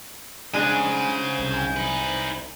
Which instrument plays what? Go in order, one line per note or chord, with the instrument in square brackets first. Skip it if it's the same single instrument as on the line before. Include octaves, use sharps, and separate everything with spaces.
[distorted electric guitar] C#3 [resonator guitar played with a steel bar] G#3 D4 G#4 [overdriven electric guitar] C5 G#5
[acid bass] C2
[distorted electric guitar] D#4 B4